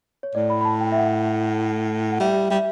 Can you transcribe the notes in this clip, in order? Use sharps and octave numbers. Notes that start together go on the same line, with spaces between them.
C#5
A2 D5
B5
B5
A5
G5
E5
F#5
F#5
G3 E5
G3 E5